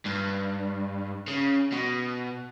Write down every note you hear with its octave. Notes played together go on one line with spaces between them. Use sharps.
G2
C#3
B2